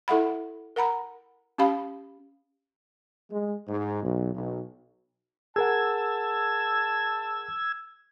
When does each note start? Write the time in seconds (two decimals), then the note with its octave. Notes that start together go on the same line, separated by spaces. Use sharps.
0.08 E4 A4 E5 F#5 B5
0.76 A#4 F#5 A#5 B5
1.58 C#4 G4 F5 B5
3.31 G#3
3.68 G#2
4.03 B1
4.34 B1
5.56 G#4 A#4 F#5 A5 E6 G#6